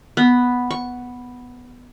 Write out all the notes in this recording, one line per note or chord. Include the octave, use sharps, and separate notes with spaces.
B3
C#6